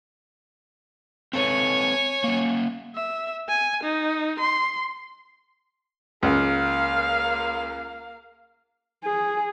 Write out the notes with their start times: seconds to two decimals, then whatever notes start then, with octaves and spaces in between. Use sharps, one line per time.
1.33 C4 A4 B4 C#5 G#5
2.24 A#3 C#4
2.95 E5
3.49 G#5
3.83 D#4
4.39 C6
6.23 C#2 A#3 F5
9.05 G#4